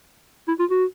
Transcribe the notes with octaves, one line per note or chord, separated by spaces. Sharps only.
E4
F4
F#4